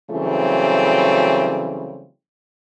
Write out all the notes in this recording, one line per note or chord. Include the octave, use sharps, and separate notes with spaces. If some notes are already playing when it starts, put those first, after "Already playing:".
C#3 E3 F#3 G3 A3 C4